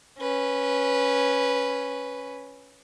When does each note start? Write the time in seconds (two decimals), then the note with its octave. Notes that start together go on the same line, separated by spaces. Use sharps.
0.19 C#4 B4